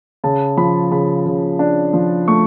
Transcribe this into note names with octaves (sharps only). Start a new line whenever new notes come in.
C#3 A5
F3 B5
C#3 B5
C#3
D4
F3
A3 C#6